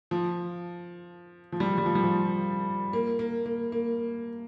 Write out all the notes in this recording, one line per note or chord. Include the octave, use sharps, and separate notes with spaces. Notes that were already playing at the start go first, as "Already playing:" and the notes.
F3
F3
G3
F3
G3
F3
G3
F3
A#3
A#3
A#3
A#3